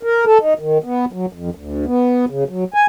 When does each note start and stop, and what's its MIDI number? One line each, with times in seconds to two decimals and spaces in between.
0.03 0.25 70
0.26 0.38 69
0.40 0.54 63
0.59 0.78 51
0.84 1.05 59
1.13 1.26 54
1.33 1.50 41
1.55 1.85 38
1.86 2.25 59
2.29 2.44 49
2.49 2.64 54
2.74 2.87 80